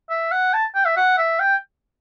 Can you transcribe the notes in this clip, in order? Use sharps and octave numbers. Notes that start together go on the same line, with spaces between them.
E5
F#5
A5
G5
E5
F#5
E5
G5